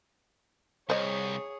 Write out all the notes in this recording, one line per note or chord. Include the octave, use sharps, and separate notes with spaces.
C2 G#4 C5 C#5 D#5